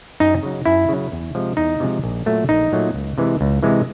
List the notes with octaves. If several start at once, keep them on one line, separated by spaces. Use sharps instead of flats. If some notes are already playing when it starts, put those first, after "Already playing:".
F#2 D#4
C#3 F#3
F#2 E4
C#3 F#3
E2
C3 F3 G#3
E2 D#4
C3 F3 G#3
A#1
A#2 F#3 A3
A#1 D#4
A#2 F#3 A3
C#2
C3 E3 G#3
C#2
C3 E3 G#3